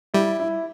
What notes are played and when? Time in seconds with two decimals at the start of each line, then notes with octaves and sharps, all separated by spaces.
0.14 G3 E4
0.40 E4